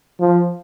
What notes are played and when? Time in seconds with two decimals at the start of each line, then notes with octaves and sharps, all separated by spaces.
0.20 F3